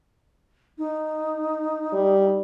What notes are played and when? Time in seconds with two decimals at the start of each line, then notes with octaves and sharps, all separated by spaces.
0.78 D#4
1.93 G3